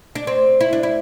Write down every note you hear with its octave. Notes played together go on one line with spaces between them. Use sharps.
D4
C4
E4
D4
E4